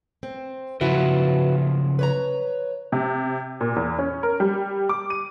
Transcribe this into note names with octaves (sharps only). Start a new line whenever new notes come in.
C4
C#3 F3 F#3 E4 F#4 B4
B4 C#5 A#5
C3
A#2
E2
C#4
A#4
G3
D6
D#7